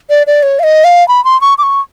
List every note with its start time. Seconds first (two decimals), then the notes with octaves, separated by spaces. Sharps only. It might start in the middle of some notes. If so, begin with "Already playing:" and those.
0.10 D5
0.27 D5
0.43 C#5
0.59 F5
0.63 D#5
0.84 F5
1.08 B5
1.25 C6
1.41 C#6
1.58 D6
1.63 C#6